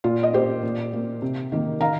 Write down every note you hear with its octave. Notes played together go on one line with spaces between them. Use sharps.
A#2 F4
D#5
A#3 G4 C5
A#2
A#3
C3
D#3 A#3
D#3 F5 A#5